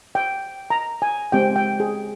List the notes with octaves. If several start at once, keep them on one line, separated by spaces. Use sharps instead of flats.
G5
A#5
G#5
G#3 C4 G4 G5
G5
G#4